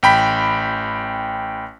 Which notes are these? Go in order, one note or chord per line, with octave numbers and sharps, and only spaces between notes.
A1 G5 B5 B6